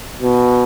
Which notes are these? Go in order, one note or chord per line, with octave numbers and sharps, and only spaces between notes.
B2